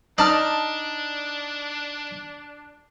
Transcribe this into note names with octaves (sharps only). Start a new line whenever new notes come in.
D4 D#4 D5 A5 F6